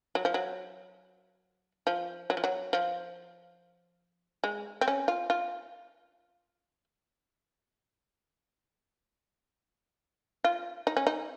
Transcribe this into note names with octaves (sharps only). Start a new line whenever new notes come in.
F#3
F3
F#3
F3
F#3
F3
F#3
F3
G#3
C4
C#4
F4
F4
F4
D#4
C#4
D#4